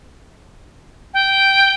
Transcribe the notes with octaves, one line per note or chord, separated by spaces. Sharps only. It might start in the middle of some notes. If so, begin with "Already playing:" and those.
G5